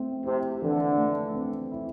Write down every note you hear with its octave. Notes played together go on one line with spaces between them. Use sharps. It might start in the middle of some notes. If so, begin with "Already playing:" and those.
Already playing: A3 C4
C3 E4
D3 E3
A3
C4
E4